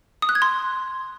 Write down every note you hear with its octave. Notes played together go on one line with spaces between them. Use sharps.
D#6
F#6
G#6
C6